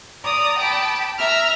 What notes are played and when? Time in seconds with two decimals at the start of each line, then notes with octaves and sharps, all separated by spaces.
0.23 D5 A#5 D#6
0.59 G5 A5 B5 D6
1.19 E5 A#5 F6